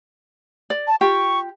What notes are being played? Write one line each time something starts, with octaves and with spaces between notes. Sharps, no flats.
D5
A5
F4 G4 G5 C#6